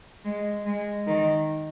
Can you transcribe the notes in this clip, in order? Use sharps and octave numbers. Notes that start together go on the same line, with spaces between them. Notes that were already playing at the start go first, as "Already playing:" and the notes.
G#3
G#3
D#3